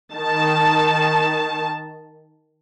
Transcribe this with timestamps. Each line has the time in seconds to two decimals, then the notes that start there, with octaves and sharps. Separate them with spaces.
0.16 D#3 A5